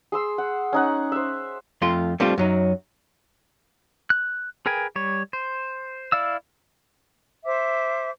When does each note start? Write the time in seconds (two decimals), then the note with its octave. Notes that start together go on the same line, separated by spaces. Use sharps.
0.12 G#4 C6 E6
0.38 F#5
0.73 C#4 D#4 F#5
1.12 C5 E5
1.82 F2 A3 F4 C6
2.20 G3 A3 C4 D4 F4
2.38 F#2 F#3 D#4
4.10 F#6
4.66 G#4 A#4 B4 G5 G#5
4.96 G3 C#5
5.33 C5
6.12 E4 D5 F5 E6
7.45 C5 E5 D6